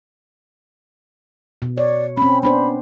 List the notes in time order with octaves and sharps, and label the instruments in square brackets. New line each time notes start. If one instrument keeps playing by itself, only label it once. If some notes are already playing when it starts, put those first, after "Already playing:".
[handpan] B2
[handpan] C#5 [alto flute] D5
[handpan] C4 C#4 [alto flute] B5
[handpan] B3 D4 C5 [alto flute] B5